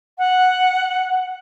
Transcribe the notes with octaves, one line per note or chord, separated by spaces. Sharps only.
F#5